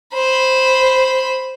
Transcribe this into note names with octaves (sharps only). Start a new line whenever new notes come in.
C5 B5